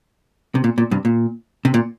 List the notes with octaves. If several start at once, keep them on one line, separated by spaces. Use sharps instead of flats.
C3
A#2
A#2
G2 C3
A#2
C3
A#2